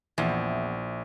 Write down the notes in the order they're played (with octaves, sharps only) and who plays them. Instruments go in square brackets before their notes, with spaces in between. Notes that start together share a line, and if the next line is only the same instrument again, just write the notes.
[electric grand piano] A#1 [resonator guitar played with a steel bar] E2